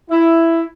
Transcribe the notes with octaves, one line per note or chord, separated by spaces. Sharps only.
E4